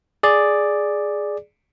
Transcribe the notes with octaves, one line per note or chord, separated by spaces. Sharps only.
G#4 D5